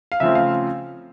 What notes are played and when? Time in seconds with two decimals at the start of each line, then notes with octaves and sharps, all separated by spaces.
0.12 F5
0.20 C#3 F3 A3 C4 E5
0.35 F5